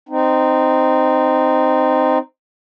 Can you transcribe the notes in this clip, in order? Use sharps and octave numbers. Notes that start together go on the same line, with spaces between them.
C4 D#4